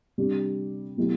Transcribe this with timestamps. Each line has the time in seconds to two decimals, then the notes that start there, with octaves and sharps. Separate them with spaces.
0.18 C3 G3 D4 G4
0.97 B2 F#3 A3 E4 G4